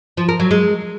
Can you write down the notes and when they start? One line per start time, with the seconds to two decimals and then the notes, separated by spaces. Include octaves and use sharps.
0.17 F3
0.29 A#4
0.40 F#3
0.51 G#3